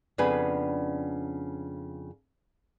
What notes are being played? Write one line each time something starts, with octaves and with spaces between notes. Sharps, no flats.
F2 C#3 B3 D4 B4 G#5